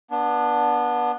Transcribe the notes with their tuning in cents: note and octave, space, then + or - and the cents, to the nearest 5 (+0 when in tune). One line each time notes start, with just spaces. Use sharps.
B3 -25 D4 +0